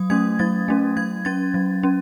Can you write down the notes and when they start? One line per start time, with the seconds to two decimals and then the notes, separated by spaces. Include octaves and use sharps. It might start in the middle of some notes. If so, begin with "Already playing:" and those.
Already playing: F#3 D#6
0.10 A3 C#4 G#6
0.39 F#3 A6
0.68 A3 C#4
0.97 F#3 G#6
1.25 C#4 A6
1.54 F#3
1.83 C#4